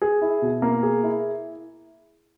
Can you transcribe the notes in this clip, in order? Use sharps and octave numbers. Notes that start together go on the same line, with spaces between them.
G#4
E4
B2
A#3
G#4
E4